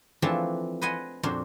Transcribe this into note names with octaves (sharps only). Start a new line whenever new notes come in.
E3 F3 A3 C4 D4 A5
B4 C5 D#5 F#5 G#5
F2 A#2 D4 F#4 C5 C6